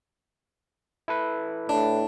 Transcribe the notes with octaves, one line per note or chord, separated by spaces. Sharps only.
E4 A4 B4
A2 D4